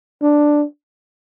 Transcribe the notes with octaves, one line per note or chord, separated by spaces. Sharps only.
D4